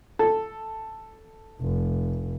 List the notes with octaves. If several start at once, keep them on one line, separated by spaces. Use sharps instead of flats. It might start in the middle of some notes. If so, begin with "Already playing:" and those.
A4
F1